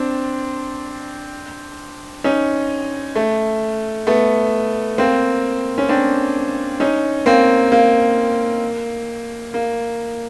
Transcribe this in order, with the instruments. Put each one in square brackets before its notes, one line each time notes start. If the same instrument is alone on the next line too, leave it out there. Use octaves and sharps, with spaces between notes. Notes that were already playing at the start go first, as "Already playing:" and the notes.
Already playing: [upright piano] C4 D4
C#4 D#4
A3
A3 B3
A#3 C4
C#4
C4 D4
C#4 D#4
A#3 C4
A#3
A#3